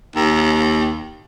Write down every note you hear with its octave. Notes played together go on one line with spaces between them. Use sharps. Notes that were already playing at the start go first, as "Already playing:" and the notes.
D#2